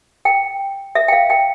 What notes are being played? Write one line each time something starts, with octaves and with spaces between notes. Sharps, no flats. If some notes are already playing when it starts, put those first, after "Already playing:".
G5
E5
G5
F5
G5